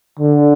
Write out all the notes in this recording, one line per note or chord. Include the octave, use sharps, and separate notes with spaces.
D3